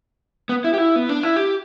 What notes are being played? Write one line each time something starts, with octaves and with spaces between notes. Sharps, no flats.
B3
E4
G4
E4
B3
D4
E4
G4